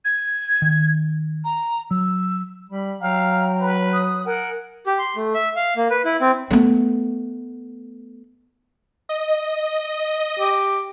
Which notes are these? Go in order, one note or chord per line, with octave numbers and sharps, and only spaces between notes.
G#6
D#3
A#5
F#3 E6
G3 B5
F#3 F5 G5 A#5
B4
D#6 F#6
A#4 F#5 G#5
G4
C6
A3
E5
F5
A#3
B4
E4
C4
A3 B3
D#5
G4